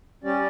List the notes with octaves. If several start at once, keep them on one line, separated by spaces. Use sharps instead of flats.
G3 C#4 G4 D5